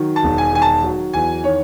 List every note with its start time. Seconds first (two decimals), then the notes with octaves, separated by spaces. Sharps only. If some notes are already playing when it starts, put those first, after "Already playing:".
Already playing: D#3 F#3
0.16 A5
0.23 E1
0.38 G#5
0.53 D#3 G#5
0.62 A5
0.84 F#3
1.13 E2 G#5
1.44 D#3 C#5